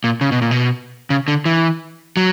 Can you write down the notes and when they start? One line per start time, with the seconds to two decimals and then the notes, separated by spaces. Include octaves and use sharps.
0.04 A#2
0.21 C#3
0.32 B2
0.42 A#2
0.51 B2
1.10 C#3
1.28 D3
1.45 E3
2.17 F#3